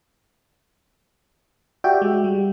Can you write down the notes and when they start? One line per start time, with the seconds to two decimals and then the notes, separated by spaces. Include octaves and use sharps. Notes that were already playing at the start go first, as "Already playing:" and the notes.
1.84 F#4 G4 D5 E5 G5
2.02 G#3
2.24 G3